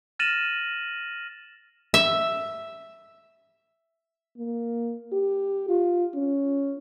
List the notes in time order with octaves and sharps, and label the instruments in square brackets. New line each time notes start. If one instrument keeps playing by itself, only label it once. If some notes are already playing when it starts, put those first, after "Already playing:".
[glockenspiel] F6 A6 A#6 D#7 E7 F#7
[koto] E5
[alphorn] A#3
G4
F4
C#4